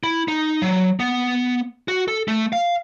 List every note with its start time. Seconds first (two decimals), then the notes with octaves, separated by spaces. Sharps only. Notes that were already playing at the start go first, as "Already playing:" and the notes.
0.03 E4
0.28 D#4
0.62 F#3
1.00 B3
1.88 F#4
2.08 A4
2.28 A3
2.53 F5